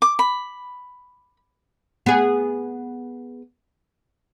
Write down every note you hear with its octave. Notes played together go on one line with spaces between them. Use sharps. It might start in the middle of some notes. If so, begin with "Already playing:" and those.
D6
B5
B3 G#4